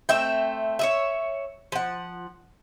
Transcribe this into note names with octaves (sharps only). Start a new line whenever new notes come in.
A3 C4 E5 G5
C#5 D#5 E5
F3 F#5